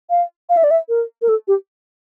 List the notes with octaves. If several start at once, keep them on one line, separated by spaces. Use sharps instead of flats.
F5
F5
E5
D5
E5
A#4
A#4
A4
G4